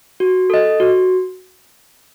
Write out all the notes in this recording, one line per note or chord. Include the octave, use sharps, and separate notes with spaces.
F#4
A4 D#5
F#4